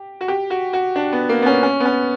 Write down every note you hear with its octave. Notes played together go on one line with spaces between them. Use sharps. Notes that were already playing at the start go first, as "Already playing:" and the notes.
Already playing: G4
F#4
G4
F#4
F#4
D4
B3
A#3
B3
C#4
C#4
B3
C#4